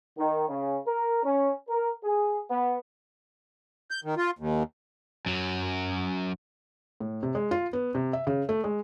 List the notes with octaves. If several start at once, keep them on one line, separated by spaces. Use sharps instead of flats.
D#3
C#3
A#4
C#4
A#4
G#4
B3
G6
D#3
F4
D#2
F#2 F#3
A2
C3
G#3
F4
B3
C3
E5
C#3
A3
G#3